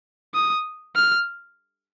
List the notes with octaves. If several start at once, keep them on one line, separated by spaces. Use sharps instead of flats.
D#6
F6